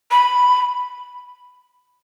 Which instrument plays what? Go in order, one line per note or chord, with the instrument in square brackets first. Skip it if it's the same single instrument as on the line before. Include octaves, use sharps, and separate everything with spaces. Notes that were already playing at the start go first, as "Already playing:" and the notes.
[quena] B5